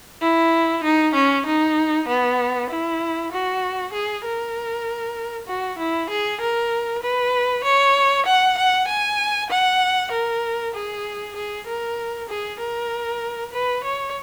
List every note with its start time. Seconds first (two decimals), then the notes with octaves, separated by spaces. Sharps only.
0.21 E4
0.83 D#4
1.14 C#4
1.46 D#4
2.08 B3
2.70 E4
3.32 F#4
3.93 G#4
4.25 A#4
5.47 F#4
5.78 E4
6.09 G#4
6.41 A#4
7.03 B4
7.64 C#5
8.26 F#5
8.58 F#5
8.88 G#5
9.50 F#5
10.11 A#4
10.74 G#4
11.36 G#4
11.66 A#4
12.29 G#4
12.59 A#4
13.52 B4
13.84 C#5